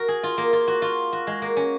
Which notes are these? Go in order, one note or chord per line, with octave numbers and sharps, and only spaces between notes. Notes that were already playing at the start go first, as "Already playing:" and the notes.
Already playing: F#4 A#4
G#4
F4
A#3
F4
F#4
F4
F#4
G#3
A#3
C#4